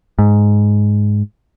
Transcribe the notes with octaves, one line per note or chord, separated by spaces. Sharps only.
G#2